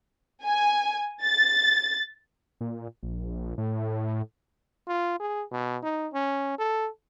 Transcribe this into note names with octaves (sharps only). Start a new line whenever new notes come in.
G#5
A6
A#2
A#1
A2
F4
G#4
B2
D#4
C#4
A4